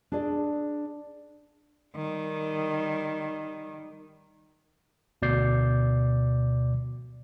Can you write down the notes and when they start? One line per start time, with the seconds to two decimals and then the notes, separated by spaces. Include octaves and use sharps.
0.12 D4 G#4 D5 D#5
1.96 D#3 G3
5.22 D2 B2 D5 G6 C7